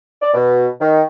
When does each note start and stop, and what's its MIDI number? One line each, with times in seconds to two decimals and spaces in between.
0.21 0.31 74
0.34 0.67 47
0.80 1.02 51